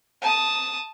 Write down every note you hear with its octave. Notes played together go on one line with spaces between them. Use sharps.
A5 D#6